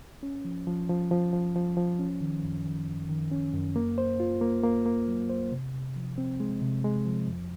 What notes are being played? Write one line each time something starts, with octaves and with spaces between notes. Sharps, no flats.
C#4
F3
F3
F3
F3
F3
F3
F3
C#4
D#3
F#2
D#3
F#2
D#3
C#4
F#2
A#3
C5
F4
A#3
A#3
A#3
F#3
C5
C3
C3
F3
C4
G#3
C3
G#3
F3
F2